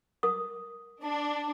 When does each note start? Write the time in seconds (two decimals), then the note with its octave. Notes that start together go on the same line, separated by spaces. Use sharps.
0.23 A#4 D#6
1.04 D4